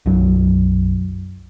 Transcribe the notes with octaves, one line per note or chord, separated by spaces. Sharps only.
B1 F#2 F#3